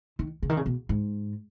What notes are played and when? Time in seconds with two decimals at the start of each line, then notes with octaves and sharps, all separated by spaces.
0.19 D#3
0.43 C#3
0.49 D#3
0.57 C#3
0.66 B2
0.89 G#2